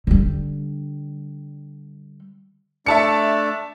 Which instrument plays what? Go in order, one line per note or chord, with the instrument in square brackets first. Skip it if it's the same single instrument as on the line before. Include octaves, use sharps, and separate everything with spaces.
[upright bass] D3 G3
[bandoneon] A3 D4 D5 [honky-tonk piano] E5 A5 C#7